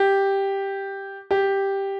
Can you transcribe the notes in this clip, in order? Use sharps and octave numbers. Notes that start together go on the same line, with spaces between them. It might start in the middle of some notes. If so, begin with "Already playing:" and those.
Already playing: G4
G4